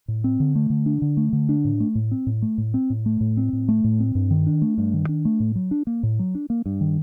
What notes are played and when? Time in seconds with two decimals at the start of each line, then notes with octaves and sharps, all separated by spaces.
0.08 A2
0.24 C4
0.40 D3
0.55 A3
0.70 D3
0.86 D4
1.02 D3
1.17 A3
1.33 D3
1.49 D4
1.65 A2
1.80 A3
1.95 A2
2.11 C4
2.27 A2
2.42 A3
2.58 A2
2.74 C4
2.90 A2
3.06 A3
3.21 A2
3.37 C4
3.53 A2
3.69 A3
3.84 A2
4.00 C4
4.15 G2
4.31 D#3
4.46 D4
4.62 A3
4.78 G2
4.94 D#3
5.09 D4
5.25 A3
5.40 A2
5.55 F#3
5.71 D4
5.87 A#3
6.03 A2
6.19 F#3
6.35 D4
6.50 A#3
6.66 G2
6.81 D#3